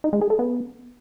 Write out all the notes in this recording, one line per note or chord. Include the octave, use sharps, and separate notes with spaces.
D#4
G#3
G#4
A4
B3